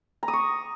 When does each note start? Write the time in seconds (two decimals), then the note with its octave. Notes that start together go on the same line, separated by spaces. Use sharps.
0.23 A#5
0.28 D#6
0.33 C#6